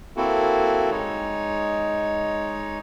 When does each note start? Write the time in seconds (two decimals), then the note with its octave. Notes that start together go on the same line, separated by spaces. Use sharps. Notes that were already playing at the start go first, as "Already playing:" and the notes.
0.17 A#3 C4 E4 F#4 A4
0.91 G#3 D#4 C#5